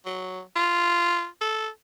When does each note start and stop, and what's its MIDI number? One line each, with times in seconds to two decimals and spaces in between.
0.05 0.41 54
0.56 1.27 65
1.41 1.68 69